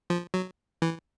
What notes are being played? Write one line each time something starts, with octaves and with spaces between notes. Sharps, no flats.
F3
F#3
E3